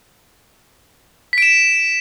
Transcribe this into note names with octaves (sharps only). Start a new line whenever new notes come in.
B6 D7 E7